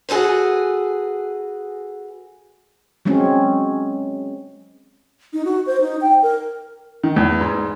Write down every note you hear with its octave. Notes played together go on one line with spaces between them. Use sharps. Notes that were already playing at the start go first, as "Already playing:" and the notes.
F#4 G#4 A4 B4 C5
F#3 G#3 C4 C#4
D#4
F#4
C5
D#4
G5
A#4
D#3
E2
G#2